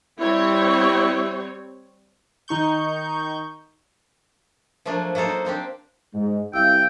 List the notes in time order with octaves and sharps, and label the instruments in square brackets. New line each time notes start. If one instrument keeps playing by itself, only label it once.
[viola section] G3 C4 C#5 [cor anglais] E4
[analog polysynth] D#3 D#4 C#6 G6
[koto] F3 F#3 A3 A#3 D4
F#3 A#3 D#4 A4 C5
F#4
A#3 C4 D4 G4
[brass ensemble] G#2
[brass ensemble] C2 [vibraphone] F5 E6 [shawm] G5